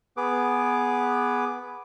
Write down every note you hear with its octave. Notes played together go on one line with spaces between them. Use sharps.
B3 G#4 B4 D6